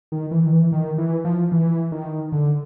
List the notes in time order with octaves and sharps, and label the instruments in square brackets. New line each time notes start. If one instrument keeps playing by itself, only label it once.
[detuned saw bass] D#3
E3
D#3
E3
D#3
E3
F3
E3
D#3
D3